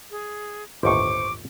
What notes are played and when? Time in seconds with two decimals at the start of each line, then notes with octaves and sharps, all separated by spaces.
0.11 G#4
0.83 G1 D#2 A2 C5 C#6 D6